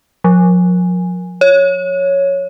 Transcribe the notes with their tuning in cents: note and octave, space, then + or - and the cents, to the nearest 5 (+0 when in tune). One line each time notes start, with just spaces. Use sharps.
F3 +45
C#5 +0